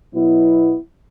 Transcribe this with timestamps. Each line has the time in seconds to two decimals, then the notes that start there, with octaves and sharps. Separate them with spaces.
0.14 B2 F#3 B3 E4